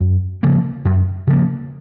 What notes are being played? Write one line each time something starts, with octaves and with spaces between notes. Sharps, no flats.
F#2
C#3 F3 A#3
F#2
C#3 F3 A#3